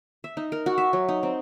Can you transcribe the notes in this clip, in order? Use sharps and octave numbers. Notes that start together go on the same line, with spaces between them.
E5
D#4
A#4
F#4
E5
F#3
D#4
C4